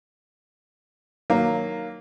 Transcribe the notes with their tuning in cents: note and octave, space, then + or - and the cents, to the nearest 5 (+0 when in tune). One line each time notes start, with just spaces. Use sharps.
D#3 +0 F#3 +0 A#3 +0